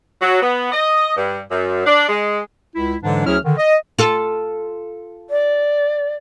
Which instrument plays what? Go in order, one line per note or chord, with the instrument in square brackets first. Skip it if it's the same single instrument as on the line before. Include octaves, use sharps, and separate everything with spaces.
[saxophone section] F#3
B3
D#5
G2
F#2
D4
G#3
[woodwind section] C#2 E4
G#2 D3 E3 F#3 G#3 D4
D2 F#3 C#4 E4 G#4 F6
D3 D#3
D#5
[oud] F4 A4
[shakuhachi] D5